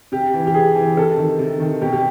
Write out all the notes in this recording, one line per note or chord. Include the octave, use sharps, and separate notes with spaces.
C3 G4
E3
G4
C3 G#4
E3
C3 A4
D#3
C3
D#3
B2 G4
G4